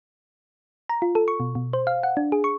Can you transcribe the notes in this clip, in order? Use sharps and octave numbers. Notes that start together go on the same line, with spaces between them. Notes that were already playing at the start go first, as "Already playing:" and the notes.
A#5
F4
A4
C#6
B2
B2
C5
F5
F#5
D4
G#4
C#6